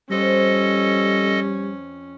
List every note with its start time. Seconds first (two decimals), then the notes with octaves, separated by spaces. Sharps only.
0.11 F2 F3 G3 C#4 A4 D#5